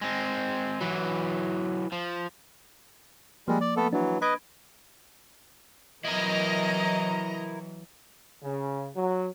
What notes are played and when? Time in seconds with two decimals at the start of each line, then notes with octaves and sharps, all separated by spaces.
0.02 G#3 C4
0.81 E3 F#3
1.92 F3
3.48 F3 G3 G#3 A#3
3.61 D5
3.77 A3 B3 A4
3.93 E3 F#3 D4
4.22 B4 D#5 B5 G#6 D7
6.05 E3 F#3 E4 A#4 D#5 A#5
8.43 C#3
8.96 F#3